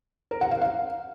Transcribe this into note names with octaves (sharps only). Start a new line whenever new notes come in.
A#4
F#5
F5
F5